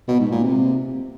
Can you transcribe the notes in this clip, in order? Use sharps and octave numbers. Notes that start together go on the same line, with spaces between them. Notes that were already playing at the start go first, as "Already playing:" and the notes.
B2
G#2
A#2
C3